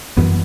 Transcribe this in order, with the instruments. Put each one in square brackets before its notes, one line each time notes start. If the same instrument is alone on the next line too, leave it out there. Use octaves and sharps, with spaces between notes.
[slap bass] F#2 E3 G3 B3